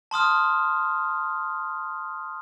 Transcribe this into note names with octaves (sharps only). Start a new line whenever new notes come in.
A5 C6 D#6 F6